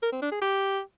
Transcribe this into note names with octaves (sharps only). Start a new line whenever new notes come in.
A#4
C4
D4
G#4
G4